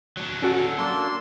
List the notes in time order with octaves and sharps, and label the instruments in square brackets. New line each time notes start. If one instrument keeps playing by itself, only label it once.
[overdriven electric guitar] F#3 D4
[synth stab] C#4 F#4 [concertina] A4
[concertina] A#3 D4 E6 [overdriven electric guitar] C6